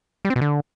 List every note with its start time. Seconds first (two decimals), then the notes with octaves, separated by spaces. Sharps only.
0.25 G3
0.30 C4
0.36 B2
0.41 D3